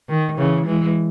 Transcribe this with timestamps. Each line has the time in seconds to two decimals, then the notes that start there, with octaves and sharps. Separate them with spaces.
0.09 D#3
0.38 C#3 E3
0.66 E3 G#3